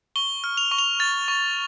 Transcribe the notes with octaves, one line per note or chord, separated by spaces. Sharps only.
C#6 G7
F6
F7
C#6
F7
F6 A6
C#6